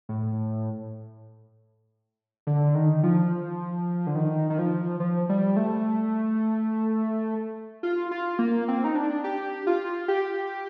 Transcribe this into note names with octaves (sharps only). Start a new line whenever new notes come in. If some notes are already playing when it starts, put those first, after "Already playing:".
A2
D3
D#3
F3
D3
D#3
D#3
F3
F3
G3
A3
F4
F4
A#3
C4
D#4
D4
G4
F4
G4